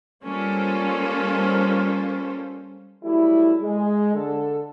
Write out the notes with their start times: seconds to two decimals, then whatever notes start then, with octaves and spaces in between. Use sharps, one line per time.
0.24 G3 A#3 C#4 F4 A4 C5
3.03 F#3 G3 A3 E4
3.61 G#3
4.14 D3 A4